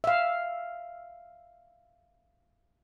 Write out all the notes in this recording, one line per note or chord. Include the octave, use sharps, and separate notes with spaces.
E5 F5